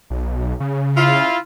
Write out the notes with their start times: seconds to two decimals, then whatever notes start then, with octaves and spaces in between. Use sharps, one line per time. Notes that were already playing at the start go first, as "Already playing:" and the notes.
0.10 B1
0.60 C#3
0.97 E4 F4